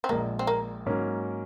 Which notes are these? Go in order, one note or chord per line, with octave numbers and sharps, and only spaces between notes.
C4
A#1 A#2 G#3 A#3
C4
A#3
G#2 F#3 A#3 C#4